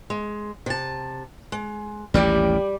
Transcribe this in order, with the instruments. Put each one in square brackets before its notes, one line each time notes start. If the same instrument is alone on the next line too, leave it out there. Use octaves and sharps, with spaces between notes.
[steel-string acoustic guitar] G#3
C3 A5
G#3
[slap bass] A1 D#2 A2 [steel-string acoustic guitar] G3 G4 D5